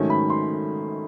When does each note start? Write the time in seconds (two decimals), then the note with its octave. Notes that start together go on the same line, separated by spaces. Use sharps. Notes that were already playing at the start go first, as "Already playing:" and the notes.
Already playing: G#2 D#3 F#3 A3 C#4
0.10 B5
0.30 C6